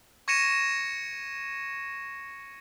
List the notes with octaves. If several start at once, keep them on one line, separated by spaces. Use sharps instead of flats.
C#6 G#6 A#6 C#7 D#7 E7